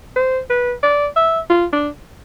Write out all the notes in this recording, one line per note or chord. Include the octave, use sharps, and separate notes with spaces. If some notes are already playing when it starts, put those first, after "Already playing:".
C5
B4
D5
E5
F4
D4